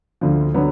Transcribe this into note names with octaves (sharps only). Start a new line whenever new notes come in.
D2 D3 F3
D3 F#3 B3